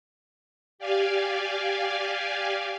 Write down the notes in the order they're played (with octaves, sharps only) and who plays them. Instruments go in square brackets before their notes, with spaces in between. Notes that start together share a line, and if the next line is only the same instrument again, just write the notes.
[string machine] G4 D5 F5 G#5